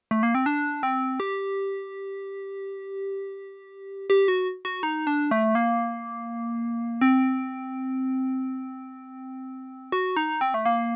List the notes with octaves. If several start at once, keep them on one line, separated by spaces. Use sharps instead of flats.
A3
A#3
C4
D4
C4
G4
G4
F#4
F#4
D#4
D4
A3
A#3
C4
F#4
D#4
C4
A3
A#3